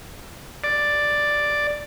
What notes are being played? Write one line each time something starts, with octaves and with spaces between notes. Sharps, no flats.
D5